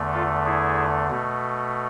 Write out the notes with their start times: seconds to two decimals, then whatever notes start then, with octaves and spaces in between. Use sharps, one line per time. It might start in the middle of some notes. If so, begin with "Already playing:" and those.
Already playing: E2 D3 A3
0.13 F4 A4
0.46 E4 G#4
1.11 B2 A3